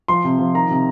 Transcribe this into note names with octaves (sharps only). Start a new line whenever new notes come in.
F3 C6
C3
F3
D#3 A#5
C3